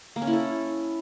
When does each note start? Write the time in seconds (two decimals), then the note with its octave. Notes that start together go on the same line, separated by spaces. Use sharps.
0.16 A#3
0.22 C#4
0.27 E4
0.33 A4